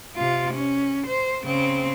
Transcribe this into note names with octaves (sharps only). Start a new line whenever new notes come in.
C3 F4
C#4
C5
C#3 C4